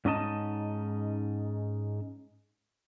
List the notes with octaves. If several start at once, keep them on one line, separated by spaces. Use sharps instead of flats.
G#2 C#4 D#4 D#5 A5